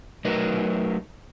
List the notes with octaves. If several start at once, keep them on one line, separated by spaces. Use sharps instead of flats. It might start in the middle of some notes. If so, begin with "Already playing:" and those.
F#3 A3 D#4 A#4 B4 D#5